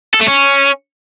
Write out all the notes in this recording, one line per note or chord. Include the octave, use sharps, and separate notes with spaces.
A4
A3
C#4